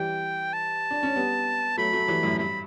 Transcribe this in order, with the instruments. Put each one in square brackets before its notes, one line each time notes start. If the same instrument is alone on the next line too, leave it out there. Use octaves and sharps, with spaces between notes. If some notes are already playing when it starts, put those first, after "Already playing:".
Already playing: [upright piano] E3 G3 [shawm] G5
[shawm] A5
[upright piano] D4
C#4
G3 B3
[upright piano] F#3 A3 [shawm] B5
[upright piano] F#3 A3
E3 G3
F#2 A2
[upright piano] G2 [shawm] B5